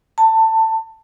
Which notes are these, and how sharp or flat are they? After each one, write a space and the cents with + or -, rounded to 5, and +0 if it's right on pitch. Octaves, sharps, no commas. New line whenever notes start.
A5 +20